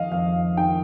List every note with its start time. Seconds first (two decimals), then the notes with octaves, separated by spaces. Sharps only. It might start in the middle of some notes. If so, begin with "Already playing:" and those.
Already playing: F2 D#3 D#5 F5
0.11 F2 F5
0.57 D#3 G5